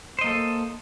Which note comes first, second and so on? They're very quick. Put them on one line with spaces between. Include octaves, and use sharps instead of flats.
C5 D#5 A#3 A4